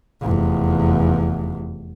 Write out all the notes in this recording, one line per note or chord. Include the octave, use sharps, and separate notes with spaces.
F1 E2